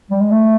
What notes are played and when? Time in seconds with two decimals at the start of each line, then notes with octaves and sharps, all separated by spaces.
0.10 G3
0.21 G#3
0.31 A3